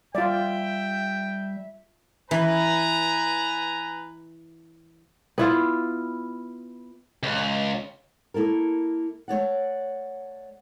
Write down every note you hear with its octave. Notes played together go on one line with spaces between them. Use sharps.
G3 F4 D5 E5 G5
E3 B4 G#5 A#5
B3 E4 F4
C#2
A#3 E4 A4 A#4
A3 C#5 D5 F#5